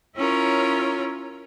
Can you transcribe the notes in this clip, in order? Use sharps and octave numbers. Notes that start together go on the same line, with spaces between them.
C#4 E4 F4 A#4 C#5